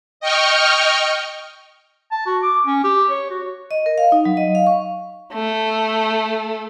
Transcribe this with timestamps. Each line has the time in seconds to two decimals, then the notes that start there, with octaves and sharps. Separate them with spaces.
0.20 D#5 G5 C#6 F6
2.12 A5
2.26 F#4
2.43 D6
2.66 C#4
2.84 G4
3.10 C#5
3.30 F#4
3.71 D#5
3.86 A#4
3.98 F5
4.12 D#4
4.25 F#3
4.37 D#5
4.55 F5
4.67 C#6
5.33 A3